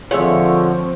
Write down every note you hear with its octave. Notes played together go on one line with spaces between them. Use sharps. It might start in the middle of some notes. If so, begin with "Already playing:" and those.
D3 F3 C4 F4 G#4 C#5 E5